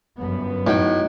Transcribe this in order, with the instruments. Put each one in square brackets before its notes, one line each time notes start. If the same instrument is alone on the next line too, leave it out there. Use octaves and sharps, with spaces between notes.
[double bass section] G1 F#2 B3
[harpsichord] A2 [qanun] D#4 F#4 G5